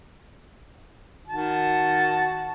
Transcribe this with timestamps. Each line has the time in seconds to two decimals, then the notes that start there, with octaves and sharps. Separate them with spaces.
1.28 D#3 F#4 A5